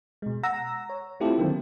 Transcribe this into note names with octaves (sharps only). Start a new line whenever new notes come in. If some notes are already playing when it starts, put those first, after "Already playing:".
B2 G#3
F#5 A#5 E6 A#6
C#5
A3 C4 E4 F4 G4 A4
D3 D#3 F#3 A#3 C4